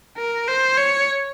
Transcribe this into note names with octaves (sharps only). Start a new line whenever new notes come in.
A#4
C5
C#5